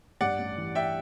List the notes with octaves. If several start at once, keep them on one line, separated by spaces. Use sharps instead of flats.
G2 D5 F#5
A1
E3
G3 E5 G5